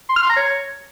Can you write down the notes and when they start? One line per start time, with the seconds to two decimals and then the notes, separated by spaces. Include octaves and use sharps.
0.09 C6
0.16 F6
0.23 C6
0.30 A#5
0.36 C#5